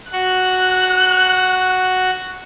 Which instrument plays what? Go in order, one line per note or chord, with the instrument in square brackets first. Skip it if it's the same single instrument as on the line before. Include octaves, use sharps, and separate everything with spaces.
[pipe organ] F#4 F#5 [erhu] F#6